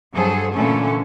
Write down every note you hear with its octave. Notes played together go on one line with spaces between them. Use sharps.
G2 F#3 G#4 A4 C5
A#2 D3 E3 A3 C#4 A4